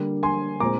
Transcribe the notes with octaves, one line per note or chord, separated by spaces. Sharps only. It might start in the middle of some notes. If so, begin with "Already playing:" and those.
Already playing: D3 G3 A#3
G#5 C6
A#2 G#3 C4 A#5 D6